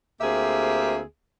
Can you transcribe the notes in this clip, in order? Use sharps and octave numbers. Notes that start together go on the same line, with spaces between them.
D2 A#3 C4 G4 G#4 E5